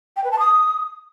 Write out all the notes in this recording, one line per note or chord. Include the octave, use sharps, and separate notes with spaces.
G5
B4
A5
D#6